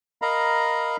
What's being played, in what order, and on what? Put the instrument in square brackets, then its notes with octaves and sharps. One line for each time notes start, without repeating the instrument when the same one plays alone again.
[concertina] A#4 D#5 F5 A#5 B5